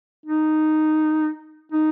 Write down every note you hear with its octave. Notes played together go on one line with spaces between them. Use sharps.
D#4
D#4